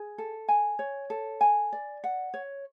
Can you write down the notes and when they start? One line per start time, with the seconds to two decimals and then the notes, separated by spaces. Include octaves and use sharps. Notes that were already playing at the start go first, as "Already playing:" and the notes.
Already playing: G#4
0.18 A4
0.48 G#5
0.79 C#5
1.10 A4
1.41 G#5
1.73 D5
2.04 F#5
2.34 C#5